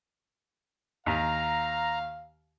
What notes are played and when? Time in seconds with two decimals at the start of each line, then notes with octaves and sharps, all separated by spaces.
1.06 D#2 F5 A#5